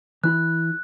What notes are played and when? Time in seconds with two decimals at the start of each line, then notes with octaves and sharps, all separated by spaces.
0.24 E3 E4 B5 F#6